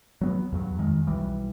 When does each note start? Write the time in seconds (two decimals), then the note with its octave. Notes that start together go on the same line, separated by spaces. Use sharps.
0.21 F#3 B3
0.52 E2 G2 F#3
0.79 F2 D#3 G#3
1.07 B1 E3 G3